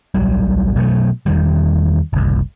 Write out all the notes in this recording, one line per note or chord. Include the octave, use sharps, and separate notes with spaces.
D1 A#1 F#3 G3
B2 F#3 G3 A3
E2 D#3 G3
F#1 C2